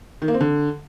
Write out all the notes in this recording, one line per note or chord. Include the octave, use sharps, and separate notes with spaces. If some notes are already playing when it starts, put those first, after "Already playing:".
D#3
A#3
C4
D3